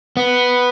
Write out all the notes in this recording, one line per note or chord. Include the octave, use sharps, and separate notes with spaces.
B3